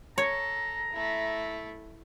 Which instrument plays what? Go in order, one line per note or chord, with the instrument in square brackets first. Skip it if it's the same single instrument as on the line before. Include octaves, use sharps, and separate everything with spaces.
[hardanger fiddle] A4 [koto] C#5 [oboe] A#5
[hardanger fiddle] A3 E4